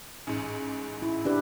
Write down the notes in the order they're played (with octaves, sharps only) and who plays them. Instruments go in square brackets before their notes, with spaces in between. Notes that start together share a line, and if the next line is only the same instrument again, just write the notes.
[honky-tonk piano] A1 G#2
[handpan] E4
D4 G4 B4